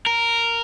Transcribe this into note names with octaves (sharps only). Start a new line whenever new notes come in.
A#4